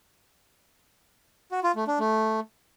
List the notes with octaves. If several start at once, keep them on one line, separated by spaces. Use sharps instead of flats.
F#4
F4
A3
D4
A3